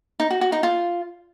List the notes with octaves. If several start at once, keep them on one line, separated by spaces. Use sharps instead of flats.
D#4
F#4
F#4
D#4
F4